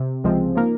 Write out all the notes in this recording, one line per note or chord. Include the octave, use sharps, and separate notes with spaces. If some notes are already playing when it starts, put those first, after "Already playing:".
Already playing: C3
C#2 C3 F3 G#3 C4
F3 A#3 D#4 A#4